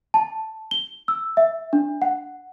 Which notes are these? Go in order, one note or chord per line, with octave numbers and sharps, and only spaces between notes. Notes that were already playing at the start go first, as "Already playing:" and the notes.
A5
G7
E6
E5
D4
F#5